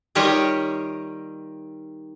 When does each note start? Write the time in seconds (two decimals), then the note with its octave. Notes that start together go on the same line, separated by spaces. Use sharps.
0.15 D#3 G3 F4 G4 C#5 D#5